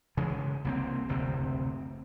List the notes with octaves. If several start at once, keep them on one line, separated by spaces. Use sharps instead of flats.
C#3 E3 G#3
C2 A#3 C4
F#1 D2 C3 C4